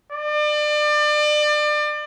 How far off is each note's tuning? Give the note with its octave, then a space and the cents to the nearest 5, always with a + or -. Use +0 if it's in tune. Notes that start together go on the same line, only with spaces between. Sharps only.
D5 +30